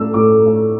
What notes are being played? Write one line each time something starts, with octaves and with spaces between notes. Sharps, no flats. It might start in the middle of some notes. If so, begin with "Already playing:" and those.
Already playing: A2 A3 D4 E6
A2 D6
A3 D4